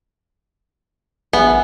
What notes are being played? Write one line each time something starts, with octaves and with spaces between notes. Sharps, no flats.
A1 B3 E5 G#5